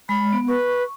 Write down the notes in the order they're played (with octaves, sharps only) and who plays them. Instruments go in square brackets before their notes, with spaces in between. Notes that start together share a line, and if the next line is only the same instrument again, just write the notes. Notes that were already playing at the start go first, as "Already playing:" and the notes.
[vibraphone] G#3 [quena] B5
[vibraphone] B3
[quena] B4 [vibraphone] C#6